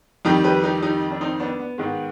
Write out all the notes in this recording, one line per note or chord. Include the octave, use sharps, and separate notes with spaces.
F2 D#3 G3 D#4 G4
G4 B4
D#4 G4
D#4 G4
D4
C4 D#4
B3 D4
B3
G#2 D#3 G#3 B3